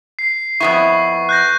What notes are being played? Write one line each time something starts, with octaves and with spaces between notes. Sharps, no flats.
C7
F2 B3 E4 C#6
F#6 G6 A#6